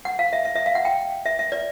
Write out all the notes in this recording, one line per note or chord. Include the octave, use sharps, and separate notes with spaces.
F#5
F5
E5
E5
E5
F5
F#5
G5
E5
E5
D5